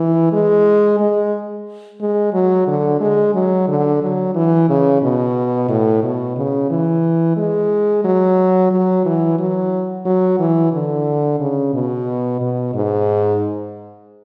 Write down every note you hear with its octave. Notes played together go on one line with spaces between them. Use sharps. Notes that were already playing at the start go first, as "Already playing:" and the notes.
Already playing: E3
G#3
G#3
G#3
F#3
D3
G#3
F#3
D3
F#3
E3
C#3
B2
A2
B2
C#3
E3
G#3
F#3
F#3
E3
F#3
F#3
E3
D3
C#3
B2
B2
G#2